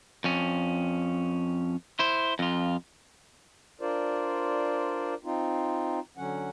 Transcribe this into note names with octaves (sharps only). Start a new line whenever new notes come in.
F2 C#4
E4 C5
F2 F4
D4 F4 A#4 C5 D5
C4 D#4 F4
D3 F#3 C#4 F#5